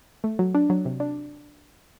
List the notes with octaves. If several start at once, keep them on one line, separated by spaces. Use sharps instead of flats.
A3
F#3
D4
F#3
C3
D4